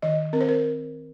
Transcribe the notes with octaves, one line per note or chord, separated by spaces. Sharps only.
D#3 D#5
C4 A#4
C5
A#4